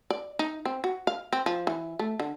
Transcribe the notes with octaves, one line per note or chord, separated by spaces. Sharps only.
D5
D#4
C4
F#4
F5
C4
F3
E3
A3
D3